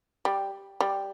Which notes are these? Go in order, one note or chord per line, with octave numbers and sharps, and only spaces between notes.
G3
G3